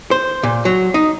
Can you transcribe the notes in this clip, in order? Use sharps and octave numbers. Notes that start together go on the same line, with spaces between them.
C5
A#2
F#3
D#4